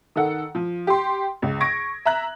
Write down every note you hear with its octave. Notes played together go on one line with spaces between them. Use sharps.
D#3 A4 F#5
F3
G4 C6
C#2
C#6 G#6 A#6 D7
E5 A#5 F#6